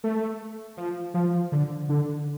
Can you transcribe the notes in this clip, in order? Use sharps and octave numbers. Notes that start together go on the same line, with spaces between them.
A3
F3
F3
D3
D3